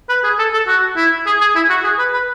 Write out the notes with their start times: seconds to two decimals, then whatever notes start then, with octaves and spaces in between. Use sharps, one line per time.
0.09 B4
0.24 G#4
0.39 A4
0.53 A4
0.67 F#4
0.96 E4
1.26 G#4
1.41 G#4
1.55 E4
1.70 F#4
1.84 G#4
1.99 B4
2.13 B4